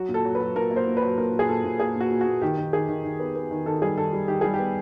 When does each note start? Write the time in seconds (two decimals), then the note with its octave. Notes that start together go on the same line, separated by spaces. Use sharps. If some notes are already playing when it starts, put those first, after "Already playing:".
Already playing: F#3 F#4
0.09 A#2
0.14 A4
0.25 F#3
0.35 B4
0.40 F#3
0.56 A#2 A#4
0.71 A#3
0.76 C5
0.87 A#2
0.97 B4
1.02 F#3
1.18 A#2 A#4
1.33 A#2
1.39 G#4
1.49 A#2 A4
1.65 A#2
1.80 A#3 G#4
1.96 A#2
2.01 F#4
2.11 A#2
2.21 F#4
2.26 A#2
2.42 D#3 G4
2.57 D#3
2.73 D#3 G#4
2.89 D#3
3.04 D#3
3.20 B3
3.35 B3
3.51 D#3
3.66 D#3 A4
3.81 G3 G#4
3.97 D#3 A4
4.13 G3
4.28 D#3 G4
4.41 G3 G#4
4.54 G4
4.59 B3